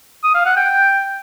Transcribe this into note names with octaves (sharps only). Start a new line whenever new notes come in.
D#6
F5
F#5
G5